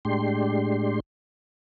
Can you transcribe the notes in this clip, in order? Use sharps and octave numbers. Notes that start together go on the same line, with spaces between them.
A2 G#3 D4 G4 C6